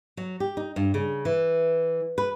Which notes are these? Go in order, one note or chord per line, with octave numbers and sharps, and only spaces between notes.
F#3
G4
D#4
G2
C#3
E3
B4